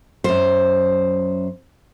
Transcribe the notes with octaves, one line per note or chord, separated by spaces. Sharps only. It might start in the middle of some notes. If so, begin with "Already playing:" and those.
F#2 C5